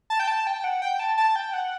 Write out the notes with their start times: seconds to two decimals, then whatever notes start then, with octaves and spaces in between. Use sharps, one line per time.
0.10 A5
0.19 G5
0.27 A5
0.47 G5
0.64 F#5
0.82 G5
0.99 A5
1.18 A5
1.36 G5
1.54 F#5